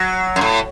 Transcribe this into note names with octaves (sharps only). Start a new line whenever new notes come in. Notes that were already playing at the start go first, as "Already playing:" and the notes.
Already playing: F#3
F#2
A2